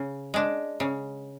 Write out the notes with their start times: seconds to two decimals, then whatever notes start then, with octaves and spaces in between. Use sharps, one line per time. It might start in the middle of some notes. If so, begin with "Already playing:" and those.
Already playing: C#3
0.34 G#3 D4
0.80 C#3